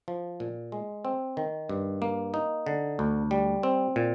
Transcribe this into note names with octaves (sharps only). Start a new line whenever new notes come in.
F3
A#2
G#3
C4
D#3
G2
A#3
D#4
D3
D2
G3
C4
A#2